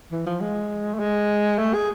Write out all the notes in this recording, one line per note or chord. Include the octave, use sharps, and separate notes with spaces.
E3
F3
G#3
A3
G#3
A3
G#4